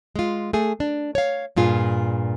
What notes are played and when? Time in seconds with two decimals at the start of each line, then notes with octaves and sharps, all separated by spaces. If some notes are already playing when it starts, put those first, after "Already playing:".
0.16 G#3 F4
0.53 A3 G#4
0.80 D4
1.15 C#5 F5
1.56 G2 A#2 F4 G#4